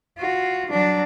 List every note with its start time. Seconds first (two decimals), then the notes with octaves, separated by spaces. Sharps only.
0.19 F4 F#4
0.70 F#3 D4